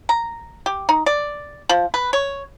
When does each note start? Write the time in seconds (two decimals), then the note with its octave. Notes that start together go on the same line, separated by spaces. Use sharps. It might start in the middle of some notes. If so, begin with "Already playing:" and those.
0.09 A#5
0.66 G4
0.89 D#4
1.06 D5
1.69 F3
1.94 B4
2.13 C#5